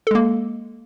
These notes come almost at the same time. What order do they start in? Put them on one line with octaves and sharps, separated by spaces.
A4 G#3 A#3